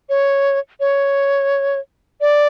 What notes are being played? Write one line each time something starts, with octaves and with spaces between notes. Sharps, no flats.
C#5
C#5
D5